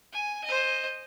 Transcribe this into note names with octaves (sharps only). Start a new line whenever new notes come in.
G#5
C5 D#5